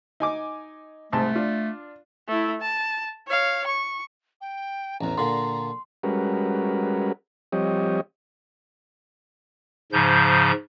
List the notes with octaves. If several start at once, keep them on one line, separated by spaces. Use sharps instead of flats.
D#4 G#5 D6
C2 G#2 A3 A5
D4 F4
A3 E4
A5
C#5 F5
C#6
G5
A1 E2 A#5
A#2 D3 C6
G3 G#3 C#4 F#4 A#4 B4
F3 G3 C4 G4 C#5 D#5
G#2 C#3 F3 G6